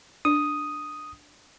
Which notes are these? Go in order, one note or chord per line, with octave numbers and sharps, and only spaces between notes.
D4 D#6